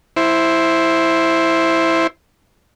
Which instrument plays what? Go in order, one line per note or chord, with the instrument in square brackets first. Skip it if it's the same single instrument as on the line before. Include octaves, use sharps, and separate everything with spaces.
[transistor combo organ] E4 C5